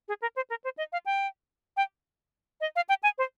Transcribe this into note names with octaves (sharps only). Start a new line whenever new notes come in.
G#4
A#4
C5
A#4
C5
D#5
F5
G5
G5
D#5
F5
G5
G#5
C5